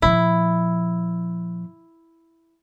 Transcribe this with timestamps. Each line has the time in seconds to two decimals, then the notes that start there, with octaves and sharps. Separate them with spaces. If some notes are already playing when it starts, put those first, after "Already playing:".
0.02 A#2 F3 E4